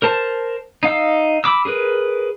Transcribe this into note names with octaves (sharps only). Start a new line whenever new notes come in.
A#4 C5 A5
D#4 F5 E6
B5 D6 E6
G#4 A#4 B4